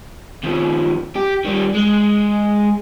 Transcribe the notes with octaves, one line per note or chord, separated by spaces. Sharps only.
D#2 F3
G4
D#3 G3
G#3